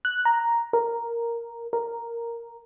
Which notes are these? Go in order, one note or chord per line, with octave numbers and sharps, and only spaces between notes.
F#6
A#5
A#4
A#4